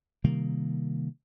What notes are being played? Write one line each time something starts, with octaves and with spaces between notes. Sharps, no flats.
C3 D#3 G3 A#3